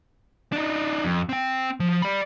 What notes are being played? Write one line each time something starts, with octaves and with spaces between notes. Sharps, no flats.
D4 D#4
F2
C4 G5
F3
D5 B5